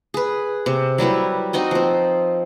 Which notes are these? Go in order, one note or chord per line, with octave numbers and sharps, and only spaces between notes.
G#4 B4
C3
F#3 G3 E4 B4
C4 D#4 F#4 D#5
F3 C4